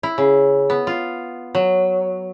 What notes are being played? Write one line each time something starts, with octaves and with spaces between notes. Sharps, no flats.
E4
C#3
B3
F4
F#3